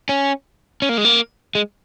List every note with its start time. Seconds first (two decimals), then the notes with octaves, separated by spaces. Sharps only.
0.09 C#4
0.82 C#4
0.89 A#3
0.98 G#3
1.05 A#3
1.55 G#3